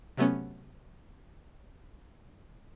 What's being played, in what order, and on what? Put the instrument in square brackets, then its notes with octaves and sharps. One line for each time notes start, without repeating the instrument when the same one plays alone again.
[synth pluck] C3 F#3 A3 B3 C#4